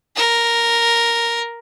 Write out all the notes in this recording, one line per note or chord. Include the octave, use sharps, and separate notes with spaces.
A#4